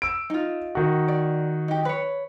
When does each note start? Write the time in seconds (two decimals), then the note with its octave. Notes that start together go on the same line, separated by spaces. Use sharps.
0.02 E6 D7
0.30 D#4 F4
0.75 D#3 F#4
1.08 D5
1.68 D#4 G4
1.85 B4 C#5